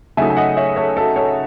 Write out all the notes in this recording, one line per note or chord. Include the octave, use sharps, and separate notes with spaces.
C#3 F#3 A3 D#4 E5 G#5
G#5
D#5 F#5
C#5 E5
A4 C#5
F#4 A4
A4 C#5